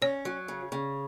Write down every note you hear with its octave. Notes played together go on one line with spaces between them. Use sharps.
C#4 C#5
F#3
C#3
C#3